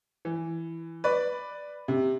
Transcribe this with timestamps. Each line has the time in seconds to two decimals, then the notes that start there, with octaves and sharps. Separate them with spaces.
0.25 E3
1.04 B4 D5
1.88 C3